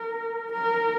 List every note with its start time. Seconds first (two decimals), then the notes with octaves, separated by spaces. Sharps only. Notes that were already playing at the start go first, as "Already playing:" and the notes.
Already playing: A#4
0.52 A#4